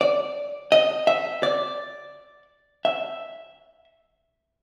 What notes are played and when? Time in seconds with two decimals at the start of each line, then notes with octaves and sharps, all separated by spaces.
0.01 D5
0.72 D#5
1.07 E5
1.43 D5
2.85 E5